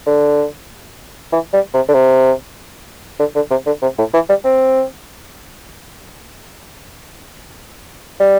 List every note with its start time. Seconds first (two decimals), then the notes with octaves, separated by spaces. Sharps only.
0.07 D3
1.32 E3
1.53 G3
1.74 C3
1.88 D3
1.94 C3
3.19 D3
3.35 D3
3.50 C3
3.66 D3
3.82 C3
3.98 A2
4.14 E3
4.29 G3
4.45 C4
8.20 G3